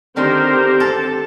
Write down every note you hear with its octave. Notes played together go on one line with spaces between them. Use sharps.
D3 D#3 C4 D#4 G4 A#4 C5
A4 A5